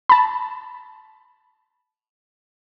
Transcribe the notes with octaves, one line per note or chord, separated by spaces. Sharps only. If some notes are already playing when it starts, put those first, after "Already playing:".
A5 B5